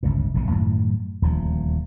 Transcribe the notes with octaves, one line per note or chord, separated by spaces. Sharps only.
G1 C#2 A2
F1 B1 A2 C#3
F#2 A2 D#3 F#3
D#1 D2 F3